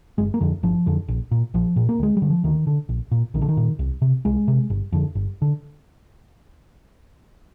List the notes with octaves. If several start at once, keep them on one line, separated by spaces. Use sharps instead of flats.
G1 G#3
A#3
F2 D3
G1 F3
F2 D3
A#1
A#2
A#1 F3
A#2
A#3
D2 G#3
G3
D3
F3
D2 D#3
D3
A#1
A#2
A#1 D#3
D3
D#3
A#2
C2
C3
C2 G#3
C3
G1
F2 D3
G1
D3